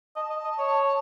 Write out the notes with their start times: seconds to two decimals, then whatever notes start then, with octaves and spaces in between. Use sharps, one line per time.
0.16 D#5 A5
0.30 D#5
0.44 D#5
0.59 C#5